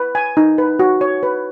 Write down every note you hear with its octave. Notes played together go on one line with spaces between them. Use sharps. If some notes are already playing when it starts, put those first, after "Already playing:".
Already playing: B4
G#5
D#4
B4
F#4
C#5
B4